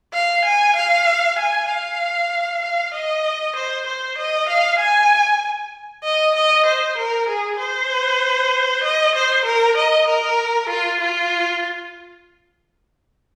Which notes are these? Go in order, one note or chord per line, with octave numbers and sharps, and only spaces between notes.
F5
G#5
F5
G#5
F5
F5
D#5
C5
C5
D#5
F5
G#5
D#5
D#5
C5
A#4
G#4
C5
D#5
C5
A#4
D#5
A#4
F4
F4